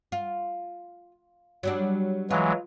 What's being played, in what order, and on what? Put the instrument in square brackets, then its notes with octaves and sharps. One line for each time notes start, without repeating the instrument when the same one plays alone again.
[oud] F4
F#3 G3 D4
[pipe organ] E3 F#3 G#3 [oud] F4